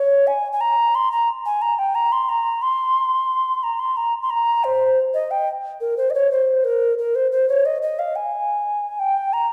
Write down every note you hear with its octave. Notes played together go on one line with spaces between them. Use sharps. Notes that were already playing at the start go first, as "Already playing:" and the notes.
Already playing: C#5
G#5
G#5
A#5
C6
A#5
G#5
A#5
G5
A#5
C6
A#5
C6
A#5
C6
A#5
C6
A#5
C5
D#5
G5
A#4
C5
D#5
C#5
C5
A#4
A#4
C5
C5
C#5
D#5
D#5
F5
G#5
G5
A#5